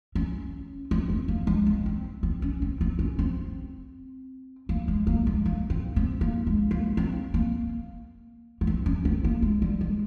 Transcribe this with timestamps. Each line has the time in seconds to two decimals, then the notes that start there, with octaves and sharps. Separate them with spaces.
0.15 C#4
0.91 C4
1.10 C4
1.28 A#3
1.47 G#3
1.66 C4
1.86 C4
2.23 C4
2.42 C#4
2.62 C4
2.81 C4
2.99 C#4
3.19 C4
4.69 A#3
4.88 G#3
5.07 A#3
5.27 G#3
5.46 A#3
5.70 C4
5.96 C4
6.21 A#3
6.47 G#3
6.71 A#3
6.97 C4
7.34 A#3
8.61 A#3
8.67 C4
8.86 C#4
9.05 C4
9.24 A#3
9.42 G#3
9.62 G3
9.81 G#3